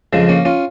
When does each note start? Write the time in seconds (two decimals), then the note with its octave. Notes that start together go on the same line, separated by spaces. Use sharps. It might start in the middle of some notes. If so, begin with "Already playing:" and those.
0.13 F2 C#3 F3 G#3
0.29 A#3 C#4
0.45 C#4 F4